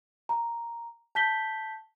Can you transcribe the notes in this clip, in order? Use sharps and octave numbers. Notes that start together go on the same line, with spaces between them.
A#5
A5 G6 B6 G7